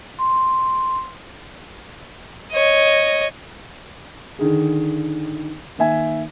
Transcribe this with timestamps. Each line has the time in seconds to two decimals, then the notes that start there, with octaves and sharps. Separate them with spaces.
0.19 C6
2.53 C#5 D#5
4.39 D3 D#3 G#4
5.78 D#3 A#3 E5 G#5